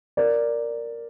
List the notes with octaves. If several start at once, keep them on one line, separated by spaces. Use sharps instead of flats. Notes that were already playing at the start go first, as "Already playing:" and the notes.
A#4 D5